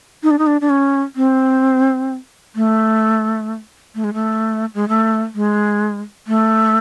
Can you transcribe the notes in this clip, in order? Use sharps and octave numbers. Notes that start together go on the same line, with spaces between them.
D#4
D4
D#4
D4
D4
C#4
C4
A3
A3
G#3
A3
G#3
A3
G#3
A3